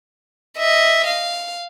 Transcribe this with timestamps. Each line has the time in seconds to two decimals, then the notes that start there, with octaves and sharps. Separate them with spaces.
0.58 D#5 E5
1.06 F5